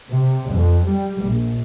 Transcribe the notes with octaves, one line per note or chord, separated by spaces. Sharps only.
C3
F2
G3
A#1